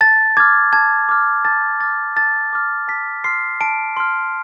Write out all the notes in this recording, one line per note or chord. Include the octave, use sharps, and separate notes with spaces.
A5 A6
D6 F6 G#6
A5 G#6
D6 F6
A5 A6
D6 F6 A6
A5 A6
D6 F6
A5 B6
C6 F6 C7
A5 D7
C6 F6